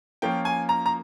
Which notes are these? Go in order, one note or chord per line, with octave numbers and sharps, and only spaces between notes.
F3 A#3 C#4 F4 G5
G#5
A#5
A#5